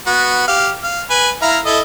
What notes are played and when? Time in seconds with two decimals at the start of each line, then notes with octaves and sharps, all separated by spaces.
0.07 B3 F#4
0.48 G4 F5
0.83 F5
1.10 B4 G#5
1.42 E4 F5 A#5
1.65 E4 A4 D#5